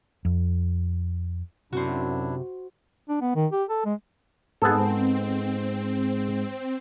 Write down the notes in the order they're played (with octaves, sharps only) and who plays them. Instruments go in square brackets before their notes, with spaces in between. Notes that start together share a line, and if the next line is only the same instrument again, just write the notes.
[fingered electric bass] F2
[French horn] F#2 [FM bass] C3 [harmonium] D4 E4 [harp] F#4 C5
[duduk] D4
B3
D#3
G4
A4
G#3
[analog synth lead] G#2 [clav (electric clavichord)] B3 G#4 A4 [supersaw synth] C4